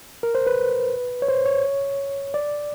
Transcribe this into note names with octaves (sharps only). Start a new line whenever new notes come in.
A#4
C5
B4
C#5
C5
C#5
D5